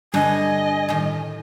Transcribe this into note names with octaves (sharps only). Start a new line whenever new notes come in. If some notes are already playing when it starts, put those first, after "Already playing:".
G2 D3 G3 D#5 G#5
A2 D#3